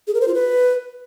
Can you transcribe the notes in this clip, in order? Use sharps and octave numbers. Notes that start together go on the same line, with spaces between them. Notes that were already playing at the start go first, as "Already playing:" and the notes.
G#4
A#4
C5
F4
B4